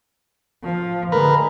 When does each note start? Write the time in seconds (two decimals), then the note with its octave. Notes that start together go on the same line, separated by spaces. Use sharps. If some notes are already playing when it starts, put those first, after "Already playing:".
0.64 F3
1.12 D3 G#3 A#4 B4